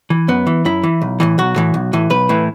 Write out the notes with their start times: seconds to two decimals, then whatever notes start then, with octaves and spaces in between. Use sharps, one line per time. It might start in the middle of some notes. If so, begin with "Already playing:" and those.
0.10 E3
0.28 F#2 B3
0.47 E3
0.65 F#2 E4
0.83 E3
1.02 B1
1.20 A2 E3
1.38 B1 F#4
1.56 A2 E3
1.74 B1
1.93 A2 E3
2.10 B1 B4
2.29 A2 E3